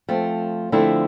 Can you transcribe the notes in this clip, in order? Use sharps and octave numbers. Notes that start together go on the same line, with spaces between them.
F3 A3 C4
D3 F3 A3 C4 E4